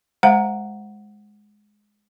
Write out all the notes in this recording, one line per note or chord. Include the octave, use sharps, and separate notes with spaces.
G#3 C5 F5 F#5 A#5